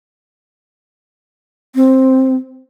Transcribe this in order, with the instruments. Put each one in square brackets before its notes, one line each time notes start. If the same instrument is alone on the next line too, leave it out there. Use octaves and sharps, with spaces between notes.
[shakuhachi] C4